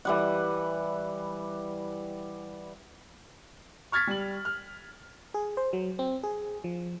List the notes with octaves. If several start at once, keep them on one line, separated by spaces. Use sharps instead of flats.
E3 G3 F#5
C#6 F6 G#6 A6 B6
G3 F#7
F6
G#4
C5
F#3
C4
G#4
F3